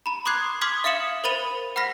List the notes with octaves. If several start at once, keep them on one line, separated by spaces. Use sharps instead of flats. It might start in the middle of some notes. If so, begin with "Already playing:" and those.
A#5 B5
C6 D6 D#6 F#6 G#6 C7
C6 D6 D#6 F6 G#6 B6
E5 F5 D#6 C#7 E7 F#7
A#4 C5 B5 A6 D#7 F7
F#5 B5 F6 A#6 B6